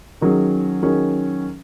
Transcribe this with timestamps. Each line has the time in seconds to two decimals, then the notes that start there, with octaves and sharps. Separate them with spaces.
0.21 D#3 F#3 C#4 G#4
0.83 D#3 F#3 C#4 G#4